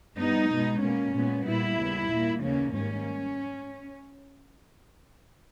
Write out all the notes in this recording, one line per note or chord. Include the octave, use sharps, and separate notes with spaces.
G2 G3 B3 D#4
B2 G#3 B3
B2 A#3 C#4
A#2 G#3 B3
A#2 G3 B3 E4
D#2 C#3 G3 B3
A#2 G3 A#3
D#2 C#3 E3 A#3 C#4
G#2 D#3 G3 A#3 C#4